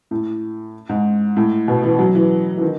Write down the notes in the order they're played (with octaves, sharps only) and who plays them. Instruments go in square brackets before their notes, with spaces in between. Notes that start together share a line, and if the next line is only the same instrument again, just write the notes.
[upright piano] A2
G#2
A2
B2
E3
F#3
E3
E3
D#3